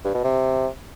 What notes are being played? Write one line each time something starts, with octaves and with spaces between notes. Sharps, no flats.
G2
B2
C3